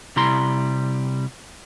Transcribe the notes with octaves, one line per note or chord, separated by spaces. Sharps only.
C3 G3 E4 A#5 C6